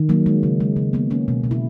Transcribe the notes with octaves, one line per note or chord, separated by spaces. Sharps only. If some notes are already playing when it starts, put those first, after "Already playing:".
Already playing: D#3
F#3 A#3
G#3
C#3
G#3
C#3
A#3 B3
A#3 C#4
B2
B2
E4